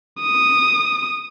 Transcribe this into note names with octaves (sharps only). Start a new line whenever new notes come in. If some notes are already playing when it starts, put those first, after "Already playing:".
D#6